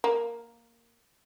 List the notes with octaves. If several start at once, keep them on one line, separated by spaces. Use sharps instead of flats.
A#3